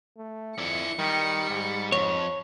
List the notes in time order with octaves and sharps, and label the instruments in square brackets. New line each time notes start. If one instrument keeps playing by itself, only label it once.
[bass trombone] A3
[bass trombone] F2 [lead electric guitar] E4 D5 [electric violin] C#7
[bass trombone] D#3 [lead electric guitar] G3
[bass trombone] G#2
[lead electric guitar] F2 [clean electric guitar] C#5